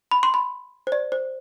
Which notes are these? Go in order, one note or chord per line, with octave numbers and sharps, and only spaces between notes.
B5
C6
B5
C5
D5
C5